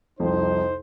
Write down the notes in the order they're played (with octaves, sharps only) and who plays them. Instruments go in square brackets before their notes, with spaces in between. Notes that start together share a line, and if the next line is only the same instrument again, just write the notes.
[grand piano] C2 F2 [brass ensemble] D#4 C5